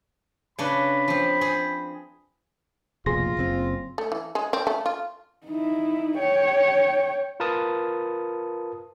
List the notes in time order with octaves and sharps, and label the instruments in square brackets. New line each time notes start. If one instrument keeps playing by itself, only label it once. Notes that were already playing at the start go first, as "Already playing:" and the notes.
[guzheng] C#3 D4 B4 [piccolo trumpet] B5
[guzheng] F3 C4
C4 G#4
[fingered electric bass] F1 A#1 B2 [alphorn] F4 [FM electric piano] G#4 C6 A#6
[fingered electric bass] F#1 A2 C4
[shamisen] A3
E3
G#3
C4
A3
F4
[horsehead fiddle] D#4 E4
C#5 G5
[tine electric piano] F4 A#4 B4 A5 D#6